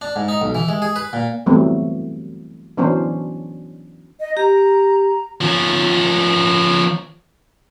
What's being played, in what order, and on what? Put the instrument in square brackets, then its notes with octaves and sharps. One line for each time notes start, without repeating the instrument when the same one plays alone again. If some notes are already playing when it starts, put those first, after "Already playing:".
[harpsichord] D4
G#2
D#4
B1
E3
G#3
G#4
B4
A#2
[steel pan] E3 F#3 G3 A3 B3 C4
E3 F#3 B3 C#4 D4 C5
[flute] D#5
[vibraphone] G4 [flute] A#5
[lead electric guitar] F3 C#4